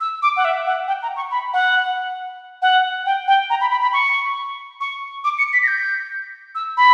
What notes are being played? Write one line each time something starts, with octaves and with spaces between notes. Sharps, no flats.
E6
D6
F#5
E5
F#5
G5
A#5
C#6
B5
F#5
F#5
G5
G5
A#5
B5
B5
B5
C#6
C#6
D6
C#7
B6
A#6
G6
E6
B5